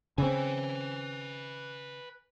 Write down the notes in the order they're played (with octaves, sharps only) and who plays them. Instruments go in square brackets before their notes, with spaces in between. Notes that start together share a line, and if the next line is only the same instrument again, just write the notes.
[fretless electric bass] C#3 C4 [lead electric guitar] B4 G#5